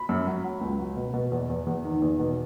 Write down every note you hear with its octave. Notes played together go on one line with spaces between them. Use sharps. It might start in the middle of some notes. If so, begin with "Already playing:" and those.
Already playing: B5
F#2
F#3
F#3
C#2
F#3
B2
B2
E2
E2
E2
D#3
E2
B2